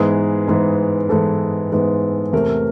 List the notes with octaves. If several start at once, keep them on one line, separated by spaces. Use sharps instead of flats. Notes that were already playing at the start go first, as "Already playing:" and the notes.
Already playing: G#2 E3 G#3 B3 G#4
G#2 E3 G#3 B3
G#2 E3 G#3 B3 A4
G#2 E3 G#3 B3
E2 C3 E3 A3 A#4